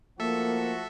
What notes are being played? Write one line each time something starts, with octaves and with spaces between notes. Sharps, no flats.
F3 A3 A#3 F#4 A4 E5